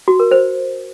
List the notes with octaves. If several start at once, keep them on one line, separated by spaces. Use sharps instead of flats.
F#4
A#4
C5